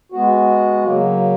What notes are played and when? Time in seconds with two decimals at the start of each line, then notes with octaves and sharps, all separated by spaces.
0.12 G#3 B3 F#4
0.84 C#3 F#3 A#3